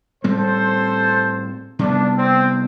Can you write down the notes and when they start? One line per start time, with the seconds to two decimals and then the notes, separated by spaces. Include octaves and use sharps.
0.24 A2 G3 C4 A4 C5
1.79 C3 G3 B3 D4
2.18 C4